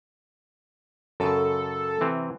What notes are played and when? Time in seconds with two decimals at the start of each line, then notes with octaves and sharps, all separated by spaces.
1.20 F#2 C#3 A4
2.01 C3 E3 C4